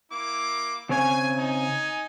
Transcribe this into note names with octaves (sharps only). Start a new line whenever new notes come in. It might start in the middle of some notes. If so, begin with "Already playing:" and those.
A#3 E4 D6
C#3 C4 C#5 G#5
D#4 G#5